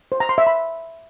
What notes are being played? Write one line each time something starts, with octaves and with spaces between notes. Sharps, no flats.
C5
A#5
C6
E5
B5